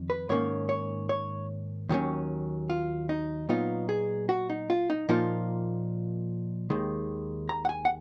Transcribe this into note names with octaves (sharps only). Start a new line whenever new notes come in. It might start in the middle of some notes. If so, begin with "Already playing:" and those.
Already playing: F2 D#3
B4
G#2 D#3 A#3 C#4 C#5
C#5
C#5
D#2 D#3 F#3 C#4
F4
D#4
A#2 F#3 B3 D#4 F4
G#4
F#4
D#4
F4
D#4
A#2 F3 A#3 D#4 F4
D#2 D#3 G#3
A#5
F#5
G#5
F#5